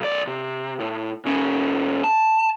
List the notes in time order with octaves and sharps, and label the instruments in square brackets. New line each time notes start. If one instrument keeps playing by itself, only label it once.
[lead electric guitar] B1 D5
C3
A2
A#2 C#4
A5